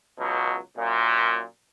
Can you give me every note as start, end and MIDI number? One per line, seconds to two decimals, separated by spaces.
0.19 0.58 37
0.19 0.58 47
0.19 0.58 54
0.77 1.42 42
0.77 1.42 46